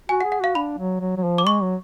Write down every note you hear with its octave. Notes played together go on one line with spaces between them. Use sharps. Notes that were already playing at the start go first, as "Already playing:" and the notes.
F#4 G#5
F#5
G#4
F#5
F#4 F5
D4 B5
F#3
F#3
F#3
F3
D6
G#3 C#6
F#3